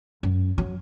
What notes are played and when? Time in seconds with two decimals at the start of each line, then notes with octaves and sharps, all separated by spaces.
0.23 F#2
0.58 F#3